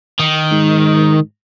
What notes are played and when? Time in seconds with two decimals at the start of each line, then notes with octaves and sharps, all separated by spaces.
0.20 D#3
0.51 G#2